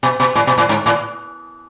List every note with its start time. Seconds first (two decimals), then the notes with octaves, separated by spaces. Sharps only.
0.03 B2
0.20 B2
0.35 A2
0.47 B2
0.58 A2
0.69 G#2
0.86 A2